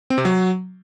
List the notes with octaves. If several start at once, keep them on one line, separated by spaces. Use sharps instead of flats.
C4
C3
F#3